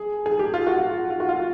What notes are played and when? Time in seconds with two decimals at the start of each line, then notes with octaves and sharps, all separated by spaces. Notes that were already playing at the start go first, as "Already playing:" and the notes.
Already playing: G#4
0.26 G#4
0.39 G4
0.54 F4
0.67 F#4
0.79 F4
1.10 F4
1.20 F#4
1.29 F4